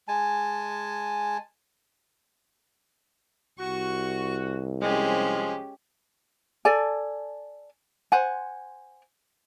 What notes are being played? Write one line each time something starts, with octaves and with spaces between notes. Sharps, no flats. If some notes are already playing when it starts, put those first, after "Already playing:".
G#3 G#5 A5
C2 F#4 C#6
F3 G#3 C#4 G4 C5
A4 D5 G#5
C5 F#5 G#5